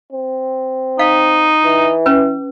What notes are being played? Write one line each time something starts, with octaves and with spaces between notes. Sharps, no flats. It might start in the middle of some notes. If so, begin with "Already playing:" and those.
C4
D#4 F5
E3
C#4 B4